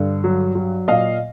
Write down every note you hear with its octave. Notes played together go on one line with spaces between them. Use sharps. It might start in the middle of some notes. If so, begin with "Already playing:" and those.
Already playing: G2 D3
F#3
F#3
A#2 D#5 F5